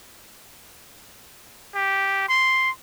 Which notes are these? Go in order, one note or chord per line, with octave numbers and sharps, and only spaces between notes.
G4
C6